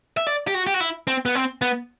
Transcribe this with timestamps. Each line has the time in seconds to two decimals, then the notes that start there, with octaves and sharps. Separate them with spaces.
0.17 E5
0.27 D5
0.47 G4
0.54 F#4
0.67 G4
0.74 F#4
0.80 E4
1.07 C4
1.26 B3
1.35 C4
1.62 B3